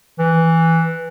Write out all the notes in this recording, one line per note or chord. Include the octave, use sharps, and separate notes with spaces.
E3